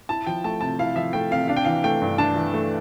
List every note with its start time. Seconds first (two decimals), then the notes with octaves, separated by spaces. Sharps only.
0.09 E4 A5
0.27 F3 G5
0.44 A3 A5
0.61 C3 A5
0.79 E4 F5
0.96 F3 E5
1.13 A3 G5
1.31 C3 F5
1.48 D4 F5
1.57 G5
1.65 E3 F5
1.84 A3 G5
2.02 G2
2.18 D4 A5
2.36 E3
2.54 A3